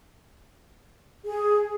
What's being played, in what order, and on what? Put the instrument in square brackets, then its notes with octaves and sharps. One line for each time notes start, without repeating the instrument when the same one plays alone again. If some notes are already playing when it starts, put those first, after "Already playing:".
[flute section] G#4